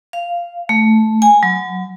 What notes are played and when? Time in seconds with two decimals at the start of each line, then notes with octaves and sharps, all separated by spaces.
0.13 F5
0.69 A3
1.22 G#5
1.43 F#3